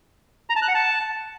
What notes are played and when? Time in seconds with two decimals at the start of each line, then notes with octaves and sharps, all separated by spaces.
0.50 A#5
0.56 A5
0.62 F#6
0.68 F#5
0.75 A5